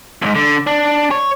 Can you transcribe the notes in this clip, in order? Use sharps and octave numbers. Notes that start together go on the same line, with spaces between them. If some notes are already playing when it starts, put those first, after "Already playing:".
C#2 G#2
D3
D4
C#5